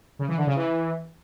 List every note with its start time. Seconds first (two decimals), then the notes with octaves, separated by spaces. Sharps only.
0.19 C#3
0.28 E3
0.38 D3
0.47 C#3
0.56 E3